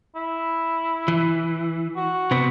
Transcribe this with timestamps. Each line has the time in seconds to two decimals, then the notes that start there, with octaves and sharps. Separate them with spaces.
0.16 E4
1.08 E3
1.96 F#4
2.31 C3 B3 C4